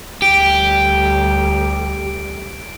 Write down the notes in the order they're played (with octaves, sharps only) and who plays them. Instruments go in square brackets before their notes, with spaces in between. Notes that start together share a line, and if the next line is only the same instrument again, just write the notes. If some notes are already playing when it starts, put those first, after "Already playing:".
[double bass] D2 G3 [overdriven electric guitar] G4 [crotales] D7